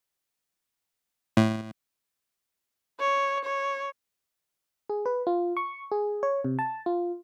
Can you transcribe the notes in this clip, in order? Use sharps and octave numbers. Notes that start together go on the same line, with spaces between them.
A2
C#5
C#5
G#4
B4
F4
C#6
G#4
C#5
C3
A5
F4